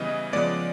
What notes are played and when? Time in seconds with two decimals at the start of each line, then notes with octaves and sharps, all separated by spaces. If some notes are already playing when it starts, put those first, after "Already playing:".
Already playing: C#3 E3 G3 B3 D#5
0.33 C#3 F3 G#3 B3 D5